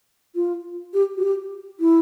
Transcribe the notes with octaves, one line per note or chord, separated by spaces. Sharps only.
F4
G4
F#4
G4
E4